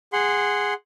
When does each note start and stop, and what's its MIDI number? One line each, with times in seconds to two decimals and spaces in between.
0.13 0.74 68
0.13 0.74 78
0.13 0.74 84